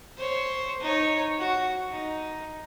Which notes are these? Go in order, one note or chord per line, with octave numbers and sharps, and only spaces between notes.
C5 C#5
D#4 C#5
F#4
D#4